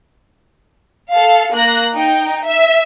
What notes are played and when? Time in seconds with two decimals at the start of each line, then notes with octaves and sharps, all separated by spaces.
1.11 A4 F5
1.54 A#3 F#6 A#6
1.95 D#4 G5
2.44 E5